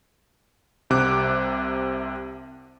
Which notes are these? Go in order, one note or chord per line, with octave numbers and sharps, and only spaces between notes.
C2 C3 D6 F#6